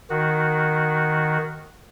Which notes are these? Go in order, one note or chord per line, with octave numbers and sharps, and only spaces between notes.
D#3 F#4